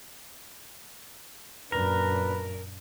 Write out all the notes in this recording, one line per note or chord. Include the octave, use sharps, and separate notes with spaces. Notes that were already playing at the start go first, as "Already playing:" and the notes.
F#2 A#2 D4 A#4 B4